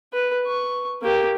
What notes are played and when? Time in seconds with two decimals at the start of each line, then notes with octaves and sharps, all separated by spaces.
0.13 B4
0.47 C#6
1.02 A#3 G4